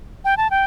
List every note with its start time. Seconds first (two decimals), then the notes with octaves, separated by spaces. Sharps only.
0.25 G5
0.37 A5
0.51 G5